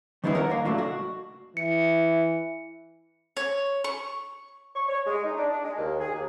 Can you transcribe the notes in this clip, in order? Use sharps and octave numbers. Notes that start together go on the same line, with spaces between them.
D#3 G3 B3 D#4 E4 G#4
A#4 C#5 F#5
D#2 A#3
A2 F#3 A#3 D4
C#2 F#4
E3 C#7
C#5
C#6
C#6
C#5
G#3
D#4
D4
D4
G#3
D#2
G#4
D#2